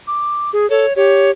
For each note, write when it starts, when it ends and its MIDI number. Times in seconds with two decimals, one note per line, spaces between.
0.07 0.51 86
0.53 0.69 68
0.70 0.86 69
0.70 0.93 73
0.96 1.31 67
0.96 1.31 73